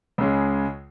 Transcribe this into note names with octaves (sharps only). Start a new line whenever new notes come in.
C#2 C#3 G#3